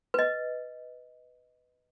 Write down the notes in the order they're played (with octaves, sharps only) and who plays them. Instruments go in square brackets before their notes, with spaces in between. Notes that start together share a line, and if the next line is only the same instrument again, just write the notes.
[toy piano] B4 D#5